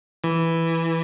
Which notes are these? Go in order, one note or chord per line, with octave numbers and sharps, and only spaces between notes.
E3